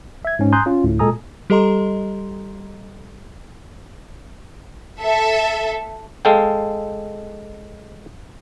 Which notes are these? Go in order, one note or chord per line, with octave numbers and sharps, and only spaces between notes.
E5 G#6
G#2 C#4
G#5 A#5 C6 D#6 F#6 G6
C#4 F4
D2 A2
A#2 G#3 A4 G#5 A#5 D#6
G3 G4 A4 D#5 A#5 C6
A4 E5
G#3 A4 F5 G5